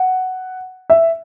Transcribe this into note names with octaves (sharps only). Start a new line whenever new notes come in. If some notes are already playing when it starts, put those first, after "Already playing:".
Already playing: F#5
E5